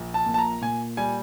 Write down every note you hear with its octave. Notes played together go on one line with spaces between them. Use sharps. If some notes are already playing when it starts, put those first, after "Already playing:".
Already playing: A#1
A5
A#2
A5
A#5
A#2 G#5
G3 G#5